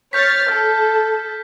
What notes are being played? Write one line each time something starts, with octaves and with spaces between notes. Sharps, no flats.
C#5 F6 G6 A6 B6
A4 F6